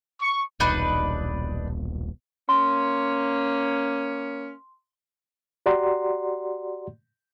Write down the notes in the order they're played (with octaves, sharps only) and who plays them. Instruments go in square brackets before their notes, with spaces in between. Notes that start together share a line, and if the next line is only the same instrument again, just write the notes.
[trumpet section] C#6
[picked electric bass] D#1 B1 [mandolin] D4 D#4 B4
[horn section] A#3 C#4 [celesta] C6
[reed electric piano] F#4 G4 D5 F#5 A#5 C6